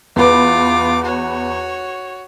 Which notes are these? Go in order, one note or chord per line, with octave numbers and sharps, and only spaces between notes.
E2 F4 B4 D6
F#4 C#5